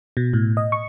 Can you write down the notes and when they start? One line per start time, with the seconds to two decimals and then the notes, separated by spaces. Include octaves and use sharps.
0.17 B2
0.33 A2
0.57 D#5
0.72 C#6